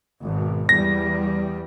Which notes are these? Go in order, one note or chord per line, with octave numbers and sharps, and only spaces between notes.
G#1 B2
E2 G3 A#6